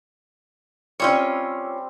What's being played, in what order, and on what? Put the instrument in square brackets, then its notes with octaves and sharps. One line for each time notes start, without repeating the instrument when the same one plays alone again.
[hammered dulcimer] G3 C4 [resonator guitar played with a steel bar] C#4 F4 C#5